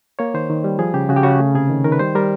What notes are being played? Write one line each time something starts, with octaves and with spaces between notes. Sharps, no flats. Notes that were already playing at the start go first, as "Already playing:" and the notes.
A#3 C#5
D#3 C5
D#3
G3
F3 G#4
C#3 G4
C#3 F#4
G4
C#3 F#4
A3
C3 G#4
D#3
D#3 A#4
B4
G3 C5
G3 A#4